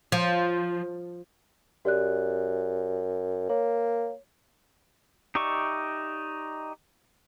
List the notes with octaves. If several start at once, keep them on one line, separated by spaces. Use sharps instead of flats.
F3
F#2 G4 D5 F#6
A#3 C#5
D#4 G4 D5 E5 C#6